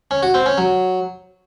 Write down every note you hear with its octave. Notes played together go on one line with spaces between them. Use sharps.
C#4
F#4
C4
C#4
F#3